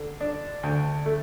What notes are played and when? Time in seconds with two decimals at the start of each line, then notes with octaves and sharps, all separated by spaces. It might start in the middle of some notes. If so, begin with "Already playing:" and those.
Already playing: D3
0.20 D4
0.63 D2
1.06 A3